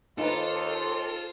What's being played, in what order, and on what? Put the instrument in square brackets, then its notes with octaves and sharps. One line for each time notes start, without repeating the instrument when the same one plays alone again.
[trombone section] D#2 [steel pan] D#4 B4 [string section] F4 C5 [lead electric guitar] A4